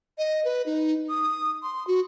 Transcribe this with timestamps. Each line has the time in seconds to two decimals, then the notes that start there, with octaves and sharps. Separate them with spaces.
0.18 D#5
0.45 B4
0.66 D#4
1.09 D#6
1.63 C6
1.87 F#4